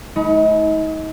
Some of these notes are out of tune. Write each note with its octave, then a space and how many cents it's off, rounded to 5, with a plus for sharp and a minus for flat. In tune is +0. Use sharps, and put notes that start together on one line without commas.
A3 -40 D#4 +30 B5 +0